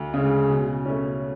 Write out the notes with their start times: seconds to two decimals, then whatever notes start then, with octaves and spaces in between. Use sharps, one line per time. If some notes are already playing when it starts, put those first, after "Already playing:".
Already playing: D2
0.14 C#3 G#3
0.50 B2
0.86 A3 C#4